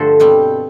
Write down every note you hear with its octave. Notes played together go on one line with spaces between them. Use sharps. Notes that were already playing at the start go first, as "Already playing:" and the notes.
Already playing: G2 D3 F3 A3 A4 C5
B2 G3 C4